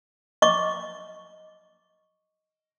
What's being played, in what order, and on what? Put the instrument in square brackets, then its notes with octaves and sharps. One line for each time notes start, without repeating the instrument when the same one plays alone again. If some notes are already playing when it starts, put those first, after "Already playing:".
[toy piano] D#5 C#6 D6